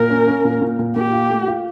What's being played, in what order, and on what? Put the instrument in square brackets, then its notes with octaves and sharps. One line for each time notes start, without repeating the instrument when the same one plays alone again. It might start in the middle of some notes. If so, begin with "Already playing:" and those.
Already playing: [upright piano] A#2 [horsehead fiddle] A#4
[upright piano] C#4
C#4
A#2
A#2
A#2
[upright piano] A#2 [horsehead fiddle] G4
[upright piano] F4
A3
F4